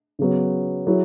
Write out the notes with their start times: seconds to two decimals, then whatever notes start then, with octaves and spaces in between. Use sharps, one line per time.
0.19 C#3 F#3 B3
0.87 F#3 E4 G#4